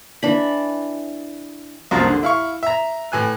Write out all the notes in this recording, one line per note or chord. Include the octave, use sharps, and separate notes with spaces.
E3 D4 B5
C2 F#2 F3 A#3
D3
E4 F5 C#6
E5 A#5
A2 E3 G#5 F#6